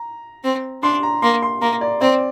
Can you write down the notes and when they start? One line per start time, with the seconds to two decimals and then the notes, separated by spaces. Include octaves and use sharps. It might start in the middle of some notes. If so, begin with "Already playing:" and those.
Already playing: A#5
0.44 C4
0.83 D4 C6
1.03 A#5
1.22 A#3 C6
1.42 C6
1.62 A#3 A#5
1.81 D5
2.01 C4 D5